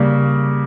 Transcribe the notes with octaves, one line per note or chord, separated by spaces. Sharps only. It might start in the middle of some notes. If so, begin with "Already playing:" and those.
Already playing: C#3 G3 A#3